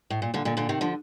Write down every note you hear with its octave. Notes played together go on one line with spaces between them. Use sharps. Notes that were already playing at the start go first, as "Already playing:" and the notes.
A2
A#2
A#2 D3
A#2 D3
A#2 D3
C3 D#3
D3 F3